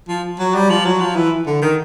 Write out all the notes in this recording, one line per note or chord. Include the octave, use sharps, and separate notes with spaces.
F3
F#3
G3
F3
F#3
F3
E3
D3
D#3